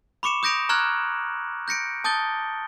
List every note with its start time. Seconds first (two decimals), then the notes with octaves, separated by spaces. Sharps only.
0.23 B5 C#6 D6 C#7 E7
0.43 D#6 G6 A#6 D7 F7
0.69 A#5 C#6 F6 F#6 G#6 F#7
1.68 G6 A#6 C#7 D7
2.04 A5 D#6 G6 A6 G7